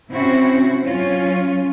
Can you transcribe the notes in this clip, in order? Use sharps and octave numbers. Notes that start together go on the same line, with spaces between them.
C3 C4 C#4 E4 F#4 C5
F#3 C#4 F4